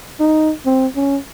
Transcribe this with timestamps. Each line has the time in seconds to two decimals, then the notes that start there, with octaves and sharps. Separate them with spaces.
0.20 D#4
0.66 C4
0.96 C#4